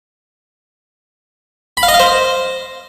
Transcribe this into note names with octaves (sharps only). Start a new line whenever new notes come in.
B5
F5
D#5
F5
C5